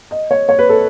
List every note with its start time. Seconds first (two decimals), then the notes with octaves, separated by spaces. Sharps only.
0.11 D#5
0.31 C#5
0.49 C#5
0.59 B4
0.69 A4